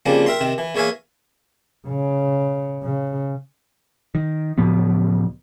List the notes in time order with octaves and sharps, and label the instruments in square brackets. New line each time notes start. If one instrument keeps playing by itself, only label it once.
[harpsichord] C#3 F3 G3 A#3 C4
A#4 E5 G5 A#5 C6
C3 D#3 C4
E3
E2 A#3 C#5 E5 F5 G#5
[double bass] C#3
C#3
[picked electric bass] D#3
C#2 A2 F3 B3